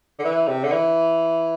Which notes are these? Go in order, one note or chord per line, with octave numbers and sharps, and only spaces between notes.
D3
E3
C3
D3
E3